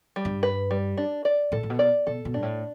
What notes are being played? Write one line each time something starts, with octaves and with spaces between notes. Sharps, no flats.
G3
G2
B4
G3
D4
D5
A2 A4
A2
B2
D5
B2 A4
B2
G2 D4
A2